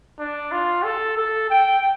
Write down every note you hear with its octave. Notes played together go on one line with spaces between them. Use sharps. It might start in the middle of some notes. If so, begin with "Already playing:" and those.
D4
F4
A4
A4
G5